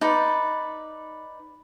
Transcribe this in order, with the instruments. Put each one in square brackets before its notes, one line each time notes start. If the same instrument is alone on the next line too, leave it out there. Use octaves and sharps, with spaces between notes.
[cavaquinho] D#4 B4 D5